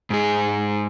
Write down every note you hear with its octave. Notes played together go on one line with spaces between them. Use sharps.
G#2 G#4